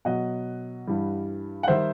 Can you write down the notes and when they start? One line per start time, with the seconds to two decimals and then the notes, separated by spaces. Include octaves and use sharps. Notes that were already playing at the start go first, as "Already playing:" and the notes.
0.05 B2 F#3 D#5 F#5
0.87 G2 E3 G3
1.63 F#5
1.68 D#3 G3 C5 E5